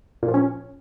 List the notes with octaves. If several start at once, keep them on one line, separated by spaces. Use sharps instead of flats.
A#2
F3
C#4